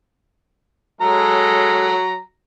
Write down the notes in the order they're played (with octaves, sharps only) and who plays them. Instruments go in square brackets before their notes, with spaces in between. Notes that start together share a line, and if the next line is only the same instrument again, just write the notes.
[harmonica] F#3 A#5 [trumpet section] G#3 A4